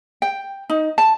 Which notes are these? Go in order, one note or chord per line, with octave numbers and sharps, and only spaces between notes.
G5
D#4
A5